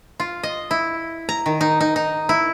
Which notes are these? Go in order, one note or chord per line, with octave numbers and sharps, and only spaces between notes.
F4
D#5
E4
A#5
D#3
D#4
D#4
D#4
E4